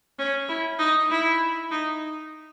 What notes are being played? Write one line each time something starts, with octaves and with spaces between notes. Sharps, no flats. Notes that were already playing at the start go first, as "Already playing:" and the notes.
C#4
E4
D#4
E4
D#4